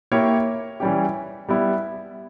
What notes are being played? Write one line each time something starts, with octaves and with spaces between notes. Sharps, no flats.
A#3 E4 G4 C#5
E3 G3 C#4 G4
G3 B3 E4